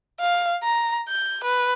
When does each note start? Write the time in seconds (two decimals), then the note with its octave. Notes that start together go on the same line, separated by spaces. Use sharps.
0.20 F5
0.63 A#5
1.09 G6
1.44 B4